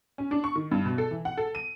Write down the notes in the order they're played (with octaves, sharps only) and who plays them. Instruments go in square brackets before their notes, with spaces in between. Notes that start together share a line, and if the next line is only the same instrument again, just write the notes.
[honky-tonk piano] C#4
D4
C#6
D#3
G2
B2
A4
E3
F#5
A4
D#7